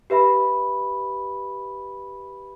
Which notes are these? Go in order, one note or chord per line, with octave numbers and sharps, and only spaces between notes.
G4 B4 E5 B5